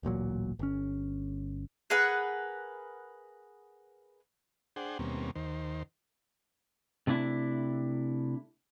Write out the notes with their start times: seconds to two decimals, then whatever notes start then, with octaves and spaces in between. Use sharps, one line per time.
0.03 D1 A1 A#2 F#3
0.59 G1 C#4
1.90 G#4 A#4 B4 F#5
4.76 D4 G#4 C5 F#5 G5
4.99 D#2 B2 G3 A#3 C4 C#4
5.35 D#2 D#3 C5
7.07 C3 A3 D4 E4